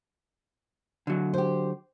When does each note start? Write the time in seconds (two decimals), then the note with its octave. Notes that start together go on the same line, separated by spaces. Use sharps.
1.07 D3 F#3
1.34 G4 C5